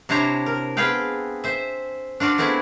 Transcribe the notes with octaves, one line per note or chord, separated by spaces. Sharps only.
C3 D4 E4 C5 C#5 A#5
A#4
B3 C4 G#4 B4 F5 G5
C5 E5
D4 F4 F#4 D5
A3 B3 C4 E4 G#4